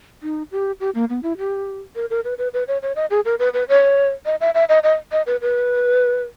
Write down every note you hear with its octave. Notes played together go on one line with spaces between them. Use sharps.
D#4
G4
G4
A#3
B3
E4
G4
A#4
A#4
B4
B4
B4
C#5
C#5
D#5
G#4
A#4
B4
B4
C#5
D#5
E5
E5
D#5
D#5
D#5
B4
B4